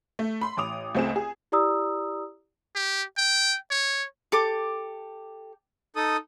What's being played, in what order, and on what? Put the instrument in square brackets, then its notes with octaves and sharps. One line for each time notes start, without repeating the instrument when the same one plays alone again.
[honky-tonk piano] A3
B5 C6
A1 D6 D#6 F7
C#2 A3 C4 G#4 E7
G#4
[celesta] E4 G4 D5 A#5 D#6 E6
[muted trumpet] G4
G5
C#5
[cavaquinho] G4 A4 D6
[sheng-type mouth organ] D#4 A4 D#6